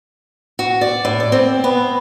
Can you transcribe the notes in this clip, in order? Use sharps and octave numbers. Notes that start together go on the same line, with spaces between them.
F#4
D5
A2
D5
C4
B3